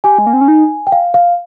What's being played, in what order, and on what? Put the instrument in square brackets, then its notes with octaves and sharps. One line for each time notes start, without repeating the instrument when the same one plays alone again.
[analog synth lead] G4 [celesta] G#5
[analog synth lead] G#3
A#3
C4
C#4
D#4
[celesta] G5
F5
F5